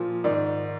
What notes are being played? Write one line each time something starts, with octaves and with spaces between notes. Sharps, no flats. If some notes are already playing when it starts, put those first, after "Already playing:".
Already playing: A#2 F3
G#2 D#3 D5